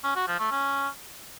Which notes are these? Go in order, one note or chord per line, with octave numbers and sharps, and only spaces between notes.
C#4
F#4
F3
A3
C#4